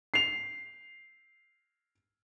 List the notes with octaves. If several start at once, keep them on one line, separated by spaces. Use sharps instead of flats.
C7 F7